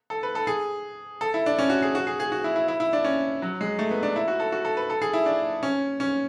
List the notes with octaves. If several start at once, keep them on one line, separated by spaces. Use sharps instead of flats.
A4
B4
A4
G#4
A4
E4
D4
C#4
F#4
G#4
F#4
G#4
G#4
F#4
E4
E4
E4
E4
D4
C#4
F#3
G#3
A3
B3
D4
E4
F#4
A4
F#4
A4
B4
A4
G#4
E4
D4
C#4
C#4